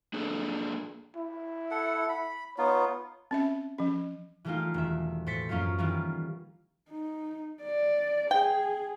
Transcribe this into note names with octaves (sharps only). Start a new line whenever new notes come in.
A#3 D4 G#4 A4
E4
A4 F#5
B5
B3 D#4 F4 C#5
C4 C#4 E5
F3 C#4
E3 G3 A3 A#3 D#4 F4
E1 D#3 E5
A2 C5 A6 B6 C#7
F#2 F3 A#3 C#4 F4
D#3 E3 G3 A#3 B3 F4
D#4
D5
G#4 G5